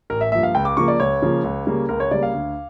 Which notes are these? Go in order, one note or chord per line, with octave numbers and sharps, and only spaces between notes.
A1 A#4
E5
G2 F3 A#3 E5
F5
C#2 G5
D6
C#3 F3 A#3 C#6
D5
C#2 C#5
C#3 F3 A#3
C#2
C#3 G3 A#3
C#2 A#4
C#5
C#3 G3 A#3 D5
F5
D2